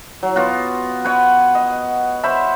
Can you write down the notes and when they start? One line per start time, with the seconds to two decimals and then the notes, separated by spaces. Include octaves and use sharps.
0.23 F#3
0.36 B3 F4 F#4
1.04 B4 C#5 F#5
1.55 D#5
2.23 C5 C#5 E5 B5